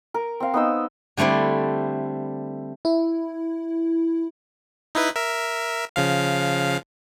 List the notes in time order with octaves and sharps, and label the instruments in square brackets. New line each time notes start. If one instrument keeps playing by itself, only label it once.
[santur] A#4
C4 F5
B3 D#4 E6
[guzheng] D3 G3 A3 C4 E4
[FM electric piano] E4
[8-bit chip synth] D#4 E4 B4
A#4 E5
C#3 F3 F5